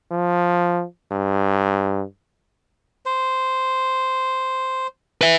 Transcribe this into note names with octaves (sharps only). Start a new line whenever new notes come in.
F3
G2
C5
B4 E5